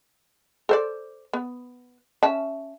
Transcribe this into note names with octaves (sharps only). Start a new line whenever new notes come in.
A4 C5 D5
B3
C#4 E5 A5